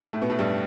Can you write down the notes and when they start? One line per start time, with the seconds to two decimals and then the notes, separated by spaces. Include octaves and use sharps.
0.13 A2 A3
0.22 B2 B3
0.30 A2 A3
0.39 G2 G3